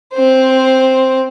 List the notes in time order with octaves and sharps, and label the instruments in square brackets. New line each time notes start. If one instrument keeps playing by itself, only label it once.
[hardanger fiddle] C4 C5